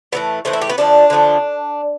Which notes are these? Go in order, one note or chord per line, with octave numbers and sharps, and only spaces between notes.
A2 E3 A3 B3
A2 E3 A3 C4
E4
G4
B3
D3 F3 A3 D4
D3 F3 A3